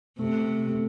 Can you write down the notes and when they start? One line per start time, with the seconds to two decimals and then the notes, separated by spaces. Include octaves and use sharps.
0.18 C3 A3
0.68 A3